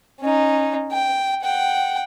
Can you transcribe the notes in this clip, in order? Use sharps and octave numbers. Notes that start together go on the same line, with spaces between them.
C#4 D#4
G5
F#5 G5